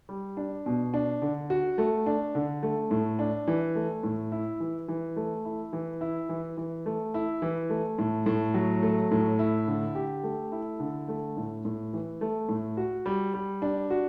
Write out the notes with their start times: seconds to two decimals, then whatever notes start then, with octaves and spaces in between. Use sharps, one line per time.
0.09 G3
0.37 D4
0.66 B2
0.94 D4
1.22 D3
1.50 F#4
1.78 A3
2.06 D4
2.35 D3
2.63 A3
2.91 A2
3.19 D4
3.47 E3
3.75 A3
4.03 A2
4.32 E4
4.60 E3
4.88 E3
5.16 A3
5.45 E4
5.73 E3
6.01 E4
6.29 E3
6.57 E3
6.86 A3
7.14 E4
7.42 E3
7.70 A3
7.98 A2
8.26 A2
8.54 F#3
8.83 A3
9.11 A2
9.39 E4
9.67 D3
9.95 G4
10.23 A3
10.52 E4
10.80 D3
11.08 A3
11.37 A2
11.65 A2
11.93 E3
12.21 A3
12.49 A2
12.77 F#4
13.06 G3
13.34 G3
13.62 D4
13.90 F#4